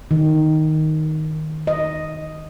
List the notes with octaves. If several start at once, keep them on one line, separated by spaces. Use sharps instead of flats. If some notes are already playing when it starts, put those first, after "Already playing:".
D#3
D#5